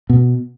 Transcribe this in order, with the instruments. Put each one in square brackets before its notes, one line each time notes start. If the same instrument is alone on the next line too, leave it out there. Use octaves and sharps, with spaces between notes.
[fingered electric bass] B2